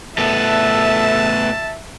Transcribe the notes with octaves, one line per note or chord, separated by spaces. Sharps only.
A2 B3 A4 E5 A5